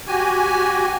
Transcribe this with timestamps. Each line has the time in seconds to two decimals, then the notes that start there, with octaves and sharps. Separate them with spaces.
0.08 F#4 G4 G#5